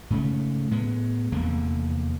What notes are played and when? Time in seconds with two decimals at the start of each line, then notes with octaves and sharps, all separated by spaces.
0.10 G#2 C#3 A3
0.71 A2 G#3 B3
1.32 F1 E2 D3 A#3